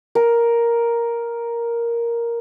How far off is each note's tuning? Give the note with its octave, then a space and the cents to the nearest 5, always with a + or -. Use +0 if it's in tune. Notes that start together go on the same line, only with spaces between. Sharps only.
A#4 +5